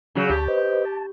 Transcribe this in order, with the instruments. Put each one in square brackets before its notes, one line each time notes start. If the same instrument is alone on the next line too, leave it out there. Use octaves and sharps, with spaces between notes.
[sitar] C#3 F#3
[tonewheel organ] D2 A5 [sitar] G4
[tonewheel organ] B4 C5 D#5
A5